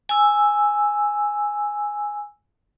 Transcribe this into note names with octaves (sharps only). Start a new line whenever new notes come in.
G#5 E6